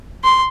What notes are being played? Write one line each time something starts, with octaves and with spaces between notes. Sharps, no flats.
C6